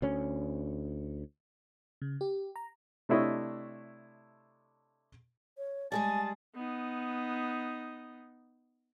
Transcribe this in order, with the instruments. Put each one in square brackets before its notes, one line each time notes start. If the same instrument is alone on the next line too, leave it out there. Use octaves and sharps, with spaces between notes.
[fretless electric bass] D2 C#4
[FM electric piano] C#3
G4
A#5
[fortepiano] C3 A3 D4 E4 C#5 D#5
[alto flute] C#5
[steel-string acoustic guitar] G3 G#3 G#4 [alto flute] G#5 [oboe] A5 [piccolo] A6
[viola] B3 D#4